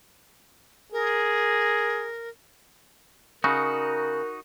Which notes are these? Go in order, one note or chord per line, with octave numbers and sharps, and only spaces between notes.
G#4 A#4
C#3 D#4 F#4 A#4